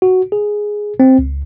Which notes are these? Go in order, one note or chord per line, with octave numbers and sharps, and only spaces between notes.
F#4
G#4
C4
C#2